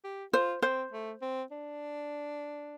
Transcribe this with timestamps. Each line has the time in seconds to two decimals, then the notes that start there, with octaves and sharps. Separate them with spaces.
0.04 G4
0.33 F4 C5
0.62 C4 C5
0.92 A3
1.22 C4
1.51 D4